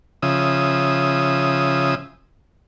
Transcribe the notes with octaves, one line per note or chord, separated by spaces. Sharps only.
C#3 F3 E5 D#6